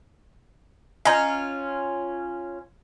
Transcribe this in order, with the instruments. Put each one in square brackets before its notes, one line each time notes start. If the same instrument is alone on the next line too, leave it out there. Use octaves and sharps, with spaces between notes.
[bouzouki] C#4 F4 [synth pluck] D#5 A#5 G6